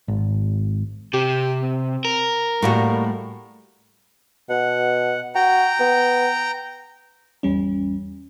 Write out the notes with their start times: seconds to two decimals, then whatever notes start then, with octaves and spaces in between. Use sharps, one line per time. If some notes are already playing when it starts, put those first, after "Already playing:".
0.08 G#1
1.13 C3 G4
1.62 C4
2.05 A#4
2.62 A2 G3 A#3 F#4
4.49 B2 F#5
5.35 F#4 G5 A#5
5.80 B3
7.43 G#1 E2 G3 C#4